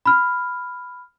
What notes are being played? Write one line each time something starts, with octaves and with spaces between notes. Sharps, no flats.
B5 F6